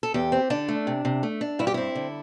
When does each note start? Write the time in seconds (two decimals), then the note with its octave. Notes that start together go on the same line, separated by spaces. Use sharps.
0.03 A4
0.14 E2 G4
0.32 C4
0.50 D3 D4
0.68 A3
0.87 C3
1.05 C3
1.23 A3
1.41 D4
1.59 G2 E4
1.67 G4
1.74 C4 E4
1.95 D3